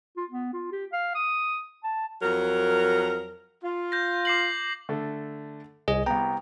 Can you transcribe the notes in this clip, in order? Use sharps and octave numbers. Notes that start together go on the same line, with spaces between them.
F4
B3
F4
G4
F5
D#6
A5
F2 F#3 A#4
F4
G6 A#6
D6 C7 F#7
D3 A3
C2 G#4 D#5
C2 B3 G5 A#5